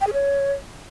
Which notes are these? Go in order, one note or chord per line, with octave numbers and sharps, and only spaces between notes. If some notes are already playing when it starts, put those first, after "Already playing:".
G5
G#4
C#5